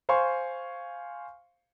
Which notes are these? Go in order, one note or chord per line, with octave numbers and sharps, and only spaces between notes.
C5 F5 G#5 C6 C#6